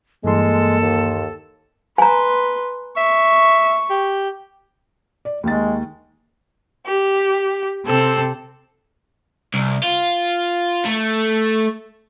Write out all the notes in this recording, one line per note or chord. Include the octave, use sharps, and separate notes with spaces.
G2 E3 G#3 A#3 A4 C6
D#2
B4 G#5 A#5 C6
E5 C#6
G4
D5
D#2 D#3 G#3 A6
G4
C3 C4 A4 E6
C2
F4
A3